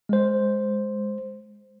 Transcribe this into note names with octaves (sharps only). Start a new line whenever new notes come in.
G#3 C5